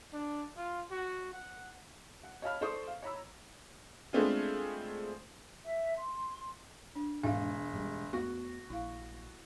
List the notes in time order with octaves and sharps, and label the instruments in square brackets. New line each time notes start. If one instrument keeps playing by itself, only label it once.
[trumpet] D4
F4
F#4
F#5
[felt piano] F#5
C#5 D#5 F5 A5 B5 F6
A4 C5 D5 C6 C#6 D#6
F5
C#5 A#5 B5 E6
[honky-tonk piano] G#3 A3 B3 C4 D4 F4
[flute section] E5
C6
[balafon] D4
[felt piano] E1 [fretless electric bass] D#2 G#2 [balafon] E5 F5
[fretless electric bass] F#2 G3 G#3
[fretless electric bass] E2 A3 B3 [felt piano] F#4 [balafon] C#6
[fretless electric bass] A#1 [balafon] E4 F5